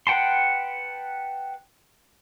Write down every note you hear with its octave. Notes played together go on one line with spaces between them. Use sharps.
B4 F#5 G5 A5 C6